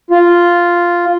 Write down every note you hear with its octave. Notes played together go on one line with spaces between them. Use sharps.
F4